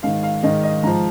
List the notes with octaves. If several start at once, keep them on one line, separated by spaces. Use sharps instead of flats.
G#2 D#3 F5
F5
G#2 D#3 D#5
D#5
G#2 F3 A#5